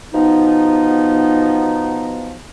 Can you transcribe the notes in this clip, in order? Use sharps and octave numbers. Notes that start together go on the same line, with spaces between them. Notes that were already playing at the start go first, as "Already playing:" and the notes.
B2 F3 B3 D#4